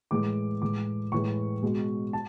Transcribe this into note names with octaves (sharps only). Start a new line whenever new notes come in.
A2 E3 G#3 D6
A2 E3 G#3 D6
A2 E3 G#3 C#6
B2 G#3
A5